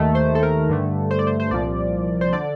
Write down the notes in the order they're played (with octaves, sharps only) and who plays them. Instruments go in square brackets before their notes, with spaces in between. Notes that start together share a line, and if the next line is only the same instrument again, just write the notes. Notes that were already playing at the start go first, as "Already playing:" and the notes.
Already playing: [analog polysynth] D#2 D#3 A3
C5
A4
A#4
G2 D3 A3
C5
D5
C5
C5
C2 A#2 F3 D5
C5
D3 D5